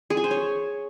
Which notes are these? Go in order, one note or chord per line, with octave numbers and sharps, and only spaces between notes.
G#4
G#5
C5
C#5